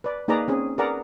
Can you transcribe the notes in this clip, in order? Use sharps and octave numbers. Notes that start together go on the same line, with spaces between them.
B4 D5
A#3 D#4 G#4 B4 D5 A#5
C4 C#4 G#4
G#4 A#4 B4 D5 F#5 A#5